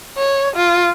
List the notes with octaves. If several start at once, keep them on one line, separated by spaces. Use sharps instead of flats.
C#5
F4